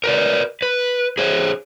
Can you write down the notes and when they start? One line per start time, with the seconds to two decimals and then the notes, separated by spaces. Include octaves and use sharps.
0.04 A#4 B4 D5
0.62 B4
1.18 G#4 C5 C#5